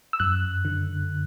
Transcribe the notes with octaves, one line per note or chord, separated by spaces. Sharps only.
E6
F#2 F#6
D3